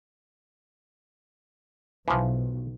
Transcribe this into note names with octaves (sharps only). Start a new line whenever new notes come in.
B1 E3 F3